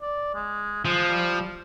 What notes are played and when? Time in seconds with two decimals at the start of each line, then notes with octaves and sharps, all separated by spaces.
0.02 D5
0.35 G#3
0.85 F3 G#3
1.08 G3